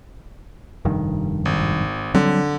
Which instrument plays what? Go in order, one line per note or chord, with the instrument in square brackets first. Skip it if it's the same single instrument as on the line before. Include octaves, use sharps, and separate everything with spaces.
[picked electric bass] F1 G2 D#3
[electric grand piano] G#1
[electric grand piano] D3 [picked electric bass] F#3 G3 C4